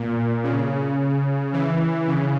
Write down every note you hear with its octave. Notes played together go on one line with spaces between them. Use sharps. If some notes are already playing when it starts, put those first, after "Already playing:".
Already playing: A#2
C#3
E3
C#3